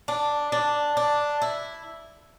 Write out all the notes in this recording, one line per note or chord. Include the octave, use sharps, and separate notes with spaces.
D4
D4
D4
E4